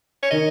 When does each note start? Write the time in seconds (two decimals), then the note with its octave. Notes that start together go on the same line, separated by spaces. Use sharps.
0.23 C#5
0.31 D#3 D#5